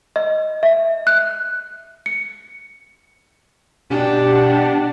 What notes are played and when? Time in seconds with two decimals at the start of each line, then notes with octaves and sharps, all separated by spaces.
0.16 D#5
0.63 E5
1.07 F#6
2.06 C#7
3.90 B2 D4 G4 F#5